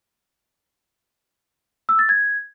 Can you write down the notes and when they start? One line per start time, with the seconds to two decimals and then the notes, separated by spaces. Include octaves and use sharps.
1.89 E6
1.99 A6
2.09 G#6